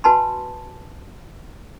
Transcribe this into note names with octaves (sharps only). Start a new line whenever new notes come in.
F#4 B4 G#5 A5 B5 C6